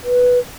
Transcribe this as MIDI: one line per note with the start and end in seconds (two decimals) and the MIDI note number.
0.04 0.39 71